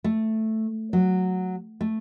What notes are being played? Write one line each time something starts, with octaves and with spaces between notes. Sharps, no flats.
A3
F#3
A3